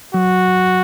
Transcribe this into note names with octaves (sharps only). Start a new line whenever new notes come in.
F#3 F#4